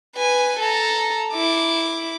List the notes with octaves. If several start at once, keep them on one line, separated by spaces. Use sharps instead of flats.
B4 G#5
A4 A#5
E4 D6